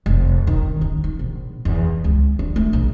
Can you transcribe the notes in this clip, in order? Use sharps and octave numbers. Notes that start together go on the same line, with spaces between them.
F1
D#3
C#4
D#4
A#1
E2
C#2
D4
A3
A#1